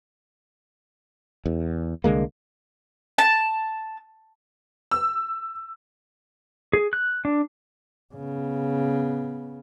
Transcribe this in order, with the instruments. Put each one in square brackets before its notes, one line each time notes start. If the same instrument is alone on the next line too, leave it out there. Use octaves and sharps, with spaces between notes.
[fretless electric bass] E2
C2 D3 G#3 A#3
[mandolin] A5
[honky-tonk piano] E6
[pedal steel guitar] G#4
F#6
D4
[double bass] C#3 B3